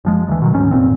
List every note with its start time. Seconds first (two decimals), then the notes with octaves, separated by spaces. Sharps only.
0.05 F#1 F3 G#3
0.28 D2 E3
0.42 B2 D#3 F#3
0.53 G#1 D2 G#2 C#4
0.71 G#1 F2 A#2 C4